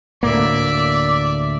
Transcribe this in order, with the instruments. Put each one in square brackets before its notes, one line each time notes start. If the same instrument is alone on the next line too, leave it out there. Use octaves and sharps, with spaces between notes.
[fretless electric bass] D2 A2 A#3 [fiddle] D5 E5